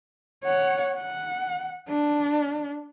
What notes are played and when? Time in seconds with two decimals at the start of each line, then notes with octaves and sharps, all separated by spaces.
0.44 C#5 F#5
0.95 F#5
1.89 D4